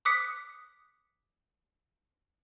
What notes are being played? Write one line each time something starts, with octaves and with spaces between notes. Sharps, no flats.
D6 D#6 F#6 B6 C#7